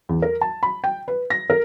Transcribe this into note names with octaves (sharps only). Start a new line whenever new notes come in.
E2
A#4
A5
B5
G5
B4
A#6
A#4